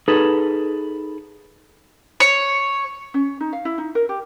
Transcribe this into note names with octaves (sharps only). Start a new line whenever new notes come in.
D#4 G#4 A4 B4
C#5
C#4
D#4
F5
E4
D#4
A#4
G4